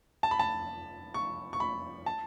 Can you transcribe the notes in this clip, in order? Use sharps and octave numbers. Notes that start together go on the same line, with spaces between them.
A5
B5
A5
C#6
C#6
B5
A5